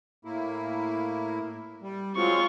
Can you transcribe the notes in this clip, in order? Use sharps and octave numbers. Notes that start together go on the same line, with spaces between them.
A2 A#3 E4
G3
F#3 G#3 C4 F4 C#6